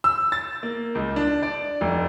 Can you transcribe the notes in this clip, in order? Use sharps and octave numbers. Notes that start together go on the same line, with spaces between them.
E6
A6
A#3
C#2
D4
D5
F1